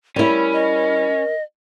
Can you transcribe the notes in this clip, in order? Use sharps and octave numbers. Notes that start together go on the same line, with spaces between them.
G3 C#4 E4 A#4
D#5